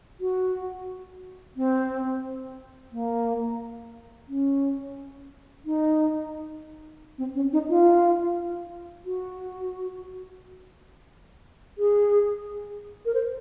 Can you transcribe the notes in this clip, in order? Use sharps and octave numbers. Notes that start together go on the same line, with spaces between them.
F#4
C4
A#3
C#4
D#4
C4
C#4
D#4
F4
F#4
G#4
A#4
C5